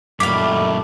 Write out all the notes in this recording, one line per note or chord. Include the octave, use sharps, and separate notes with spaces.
F#2 A#2 D#3 G3 A3 F5 B5 D6